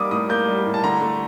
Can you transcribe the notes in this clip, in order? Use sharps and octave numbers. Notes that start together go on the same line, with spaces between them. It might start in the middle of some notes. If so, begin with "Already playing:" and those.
Already playing: G3 A#3 D#4 D6 D#6
A2 D#6
A#3 G6
G3
A2
A5
D3 A#5
A3